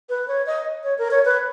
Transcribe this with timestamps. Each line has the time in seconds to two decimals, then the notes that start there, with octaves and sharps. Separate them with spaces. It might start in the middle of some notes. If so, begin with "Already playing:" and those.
0.09 B4
0.28 C#5
0.46 D#5
0.84 C#5
0.98 A#4
1.11 C#5
1.25 B4